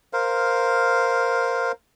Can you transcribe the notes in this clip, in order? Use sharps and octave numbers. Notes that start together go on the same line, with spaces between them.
A#4 C5 F5